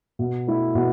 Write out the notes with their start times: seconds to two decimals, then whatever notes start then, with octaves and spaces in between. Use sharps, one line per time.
0.19 B2
0.47 A3 E4
0.75 B2